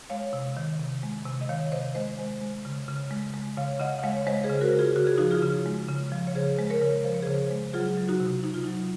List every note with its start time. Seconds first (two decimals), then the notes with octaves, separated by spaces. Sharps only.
0.10 G#3 C#5 F5
0.33 C3
0.57 D#3
0.80 C3
1.03 G#3
1.25 C3
1.41 D#5
1.49 D#3 C#5 F5
1.72 C3 C5 D#5
1.95 G#3 C5 D#5
2.19 G#3
2.41 G#3
2.65 C#3
2.88 C#3
3.11 G#3
3.34 G#3
3.57 C#3 C#5 F5
3.80 C#3 D#5 F#5
3.99 F#5
4.03 G#3 C#5 F5
4.17 C#5
4.27 G#3 C5 D#5
4.44 G#4 C5
4.50 C#3
4.61 F#4 A#4
4.73 C#3
4.79 F4 G#4
4.96 C#3 F#4
5.07 G#4
5.18 F3 D#4 F#4
5.31 F4 G#4
5.43 C#3
5.66 G#3
5.89 C#3
6.12 F3
6.27 C#5
6.35 C#3 G#4 C5
6.59 G#3
6.70 A#4 C#5
6.82 C#3
7.04 F3 C5
7.14 C#5
7.22 C#3 G#4 C5
7.51 G#3
7.74 F#3 F4 G#4
7.97 F#3
8.08 D#4 F#4
8.20 C3
8.43 C3 D#4
8.54 F4
8.64 F#3 D#4